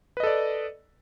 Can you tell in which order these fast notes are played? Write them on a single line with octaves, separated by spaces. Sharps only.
B4 D#5 A4 D5